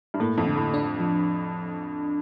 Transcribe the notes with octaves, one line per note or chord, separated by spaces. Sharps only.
G2
A2 A#3
F2
D3
A2
D4
F3